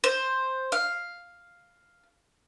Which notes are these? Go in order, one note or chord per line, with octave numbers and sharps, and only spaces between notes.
C5
F5